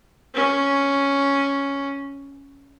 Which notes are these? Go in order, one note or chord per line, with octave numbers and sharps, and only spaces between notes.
C#4